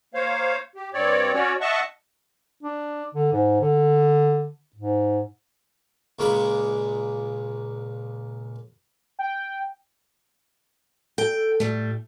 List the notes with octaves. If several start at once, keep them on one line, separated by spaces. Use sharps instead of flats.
A#3 C5 C#5 F5
G4
G2 C4 C#5 D5
C#4 F#4 C#5 D5
D#5 E5 F#5 A5 C#6
D4
D3
G#2
D3
G#2
C#2 A#2 G#3 B5
G5
A4 G5
A2 G3 A3